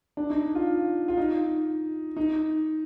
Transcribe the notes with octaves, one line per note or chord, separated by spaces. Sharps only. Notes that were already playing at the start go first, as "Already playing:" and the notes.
D4
D#4
F4
F4
D#4
D#4